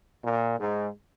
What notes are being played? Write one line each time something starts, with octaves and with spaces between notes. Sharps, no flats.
A#2
G#2